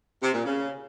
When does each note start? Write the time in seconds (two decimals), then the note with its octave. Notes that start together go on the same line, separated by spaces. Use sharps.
0.22 C3
0.33 A#2
0.45 C#3